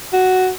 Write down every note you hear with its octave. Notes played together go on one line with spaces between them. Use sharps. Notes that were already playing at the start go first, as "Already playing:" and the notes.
F#4